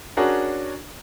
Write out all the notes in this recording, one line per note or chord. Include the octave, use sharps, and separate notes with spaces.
C#4 D4 F#4 G#4 A#4